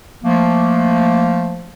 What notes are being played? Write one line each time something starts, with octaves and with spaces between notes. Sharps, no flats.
F3 A3 A#3